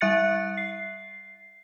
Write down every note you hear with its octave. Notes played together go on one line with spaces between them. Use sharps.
G3 E5 F#6 A6 C#7
C7